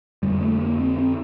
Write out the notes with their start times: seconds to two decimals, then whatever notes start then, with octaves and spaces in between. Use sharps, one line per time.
0.23 F2 D3 G3
0.42 A3
0.61 A#3
0.80 C4
0.98 C4